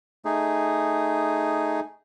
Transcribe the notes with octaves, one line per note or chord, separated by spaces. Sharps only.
A3 D#4 G#4